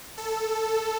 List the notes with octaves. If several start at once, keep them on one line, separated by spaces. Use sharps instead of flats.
A4